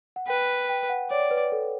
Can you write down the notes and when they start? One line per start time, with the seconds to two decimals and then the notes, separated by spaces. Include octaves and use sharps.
0.16 F#5
0.27 B4 G5
0.69 G5
0.90 F#5
1.10 C#5 D5
1.31 B4
1.52 A4